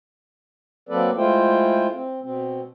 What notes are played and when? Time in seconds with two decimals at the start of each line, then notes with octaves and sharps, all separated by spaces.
0.89 F#3 A#3 C4 A4 B4 D5
1.17 G#3 A3 E4 F4 C5 G5
1.92 C4
2.22 B2 C4